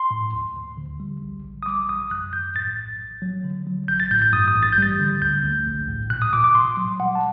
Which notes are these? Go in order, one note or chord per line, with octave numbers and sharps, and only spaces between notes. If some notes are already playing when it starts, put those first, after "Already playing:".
Already playing: C6
A2
D2
D2
D3
G3
A#1
A#1
D#6
G3 D6
A#1 D#6
F#2 F#6
F#2 G6
A2 A6
A#1
A#1
F#3
D3
F#3
A1 G6
A6
A2 G6
G6
G2 D#6
D#6
A1
A6
G6
G3 A6
D3
D2 G6
D2
A#1
A2
A#2 F#6
D#6
A#2 D6
D6
A#2 C6
F#3
G3 F#5
A5